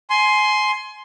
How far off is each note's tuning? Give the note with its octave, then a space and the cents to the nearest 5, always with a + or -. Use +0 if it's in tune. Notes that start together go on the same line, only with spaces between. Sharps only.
G#5 +25 C6 +0